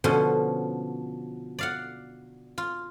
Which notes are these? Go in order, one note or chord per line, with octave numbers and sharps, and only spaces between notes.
B2 D3 F3 C#4
D5 F5 F#5
F4